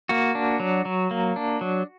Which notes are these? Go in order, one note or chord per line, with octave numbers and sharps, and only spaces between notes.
A#3 F#4
D4
F#3
F#3
A#3
D4
F#3